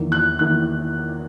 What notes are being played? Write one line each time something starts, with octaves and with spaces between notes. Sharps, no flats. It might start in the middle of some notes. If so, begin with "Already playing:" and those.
Already playing: E2 D#3 A#3 E4
F#6
E2 D#3 A#3 E4 F#6